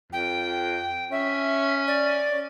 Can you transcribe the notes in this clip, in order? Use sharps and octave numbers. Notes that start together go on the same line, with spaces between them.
F2 G5
C#4 E5
D5